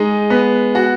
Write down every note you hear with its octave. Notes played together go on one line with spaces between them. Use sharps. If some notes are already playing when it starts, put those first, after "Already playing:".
Already playing: G#3 D#4
B3
F#4